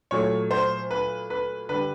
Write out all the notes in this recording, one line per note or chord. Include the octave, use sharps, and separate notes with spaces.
A#2 F#3 A3 C#5
C5
B4
B4
D3 G3 B4